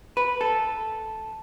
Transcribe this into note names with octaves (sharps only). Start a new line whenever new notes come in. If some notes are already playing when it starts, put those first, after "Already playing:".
B4
A4